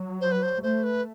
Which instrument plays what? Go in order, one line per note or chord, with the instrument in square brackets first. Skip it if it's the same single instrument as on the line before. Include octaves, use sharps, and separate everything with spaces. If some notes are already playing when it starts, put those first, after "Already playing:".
Already playing: [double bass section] F#3
[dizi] C5
B4
C5
[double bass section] A3 [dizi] C5
[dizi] B4